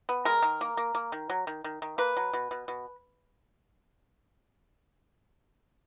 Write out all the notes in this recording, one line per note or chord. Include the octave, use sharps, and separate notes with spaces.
B3
G#3 A#4
D#3
A#3
A#3
A#3
D#3
F#3
D#3
D#3
D#3
A#3 B4
F#3
B2
B2
B2